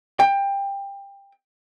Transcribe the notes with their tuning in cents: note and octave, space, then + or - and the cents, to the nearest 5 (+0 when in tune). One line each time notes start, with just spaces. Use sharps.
G5 +20